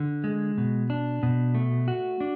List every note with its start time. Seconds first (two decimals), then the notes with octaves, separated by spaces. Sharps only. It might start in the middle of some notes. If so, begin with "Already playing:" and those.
Already playing: D3
0.24 G#3
0.58 B2
0.90 D4
1.23 B2
1.55 A3
1.88 F#4
2.20 D4